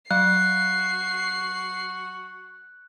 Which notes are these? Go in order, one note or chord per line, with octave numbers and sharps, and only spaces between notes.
F#3 F#4 F5 F#6 C7